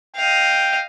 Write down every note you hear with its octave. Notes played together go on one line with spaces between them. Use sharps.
D#5 F5 G5